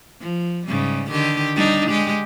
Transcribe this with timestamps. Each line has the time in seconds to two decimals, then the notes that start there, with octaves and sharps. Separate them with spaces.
0.21 F3
0.67 G#2 C#3 G3
1.11 D3 D#3 G4
1.56 G3 D4 D#4
1.90 G#3 G4